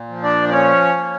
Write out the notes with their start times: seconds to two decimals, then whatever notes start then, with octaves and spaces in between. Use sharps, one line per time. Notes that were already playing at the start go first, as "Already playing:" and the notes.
Already playing: A#2
0.09 F3
0.23 D4 D5
0.49 D5
0.52 C#4 C#5
0.97 A#3